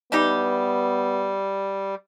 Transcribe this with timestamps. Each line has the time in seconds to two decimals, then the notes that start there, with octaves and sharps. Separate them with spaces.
0.12 E3 G3 B3 D#4 G4